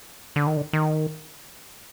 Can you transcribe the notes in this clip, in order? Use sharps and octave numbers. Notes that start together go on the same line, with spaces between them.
D3
D#3
D3
D#3